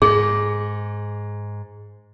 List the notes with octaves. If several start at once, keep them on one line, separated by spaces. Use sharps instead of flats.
G#2 G#4